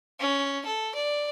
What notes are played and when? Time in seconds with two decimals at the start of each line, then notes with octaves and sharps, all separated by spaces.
0.20 C#4
0.65 A4
0.95 D5